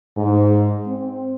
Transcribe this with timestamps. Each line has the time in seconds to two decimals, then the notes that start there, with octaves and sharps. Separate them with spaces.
0.17 G#2
0.88 C4